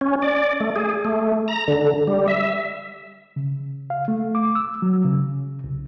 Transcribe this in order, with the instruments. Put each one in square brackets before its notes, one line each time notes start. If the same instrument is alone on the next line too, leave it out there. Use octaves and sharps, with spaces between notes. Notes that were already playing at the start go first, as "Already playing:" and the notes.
[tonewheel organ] C#4
D5
A3
G#4
A3
A#5
D3
G3
E5
[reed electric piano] C#3
F5
A3
D6
E6
F#3
C#3
C2